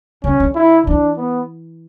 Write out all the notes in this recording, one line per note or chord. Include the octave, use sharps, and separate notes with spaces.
C#3 C#4
D3
E4
E3 D4
B3